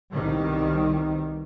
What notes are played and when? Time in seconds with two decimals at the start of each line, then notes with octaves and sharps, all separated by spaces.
0.12 C2 B2 D#3 G3